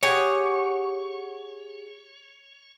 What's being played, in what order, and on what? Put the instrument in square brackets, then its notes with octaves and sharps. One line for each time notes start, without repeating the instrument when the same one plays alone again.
[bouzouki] G4 G#4 F#5 [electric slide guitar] C#5